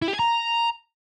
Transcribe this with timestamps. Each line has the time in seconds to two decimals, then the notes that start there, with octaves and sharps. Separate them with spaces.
0.02 E4
0.08 G4
0.14 G#5
0.19 A#5